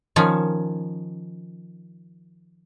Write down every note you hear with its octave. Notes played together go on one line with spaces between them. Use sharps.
D#3 F3 C#4